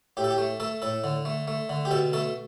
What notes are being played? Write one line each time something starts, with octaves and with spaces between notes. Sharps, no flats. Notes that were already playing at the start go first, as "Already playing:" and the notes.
A2 G4
A4
G4
A3
A3 A4
A2 A4
D3
A3
A3
D3
G4
B2 A4
A3 A4